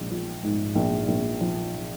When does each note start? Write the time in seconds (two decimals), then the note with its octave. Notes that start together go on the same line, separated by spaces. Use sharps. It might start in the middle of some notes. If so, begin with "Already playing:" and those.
Already playing: A#1 G#3
0.11 F3
0.43 G#2
0.75 A#1
1.08 A#1
1.41 F3